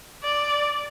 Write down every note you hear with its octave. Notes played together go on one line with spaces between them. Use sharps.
D5